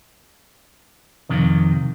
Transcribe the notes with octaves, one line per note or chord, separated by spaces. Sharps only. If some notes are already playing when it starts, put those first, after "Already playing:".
F2 C3 D#3